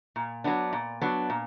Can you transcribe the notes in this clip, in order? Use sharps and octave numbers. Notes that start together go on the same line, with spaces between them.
A#2
F#3 B3 D4
A#2
F#3 B3 D4
A#2